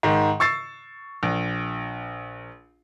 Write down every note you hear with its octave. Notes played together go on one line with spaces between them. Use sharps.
G#2 D#3
C#6 E6 A6 C7
A#1